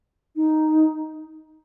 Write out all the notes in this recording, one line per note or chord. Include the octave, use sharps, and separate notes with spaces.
D#4